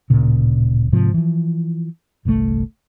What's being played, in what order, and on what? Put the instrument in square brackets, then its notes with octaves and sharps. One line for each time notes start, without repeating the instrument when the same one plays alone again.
[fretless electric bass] D1 A#2 C#3
G#2 C3 F3
E3 F3
G1 C2 C3 A3